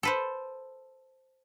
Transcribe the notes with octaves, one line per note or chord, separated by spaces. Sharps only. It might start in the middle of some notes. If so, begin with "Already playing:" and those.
A4 B4 C5